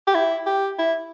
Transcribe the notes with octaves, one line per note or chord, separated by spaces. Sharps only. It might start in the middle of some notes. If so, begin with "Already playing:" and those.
G4
E4
G4
E4